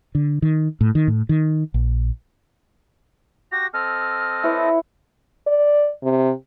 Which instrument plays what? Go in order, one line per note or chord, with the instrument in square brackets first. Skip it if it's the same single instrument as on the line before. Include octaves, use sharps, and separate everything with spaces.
[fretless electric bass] D3
D#3
A2
D#3
A2
D#3
A#1
[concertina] F#4 G4 [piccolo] A#6
[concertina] C4 A4 D#5 [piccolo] F6
[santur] E4 B4 C#5
[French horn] D5
C3